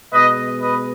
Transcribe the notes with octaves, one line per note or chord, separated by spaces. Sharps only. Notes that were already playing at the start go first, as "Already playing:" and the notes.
B2 G#3 B4 D#5
B4 D#5